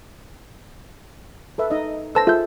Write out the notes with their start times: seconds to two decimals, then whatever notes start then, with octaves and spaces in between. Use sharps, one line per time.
1.58 A4 B4 E5
1.70 D#4 D#5
2.15 A4 B4 C5 A5 E6 A#6
2.27 F4 G#4 A4 E5 G6